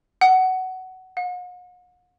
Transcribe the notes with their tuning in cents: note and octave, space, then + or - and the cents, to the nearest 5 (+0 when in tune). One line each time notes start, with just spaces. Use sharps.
F#5 +15
F#5 -45